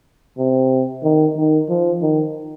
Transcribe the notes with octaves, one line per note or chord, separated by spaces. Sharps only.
C3
D#3
D#3
F3
D#3